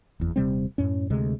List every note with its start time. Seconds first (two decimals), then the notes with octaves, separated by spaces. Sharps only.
0.20 F#1 E2
0.36 D#1 C3 G3 C4
0.78 F#2 A2 C#4
1.10 D2 C3 G#3